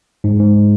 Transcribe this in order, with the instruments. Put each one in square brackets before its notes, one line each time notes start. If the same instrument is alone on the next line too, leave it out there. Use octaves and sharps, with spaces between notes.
[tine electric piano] G#2
G#2